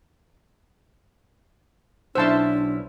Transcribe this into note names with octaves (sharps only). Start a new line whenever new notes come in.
B1 B3 C#4 D4 E4 C5 A5 E6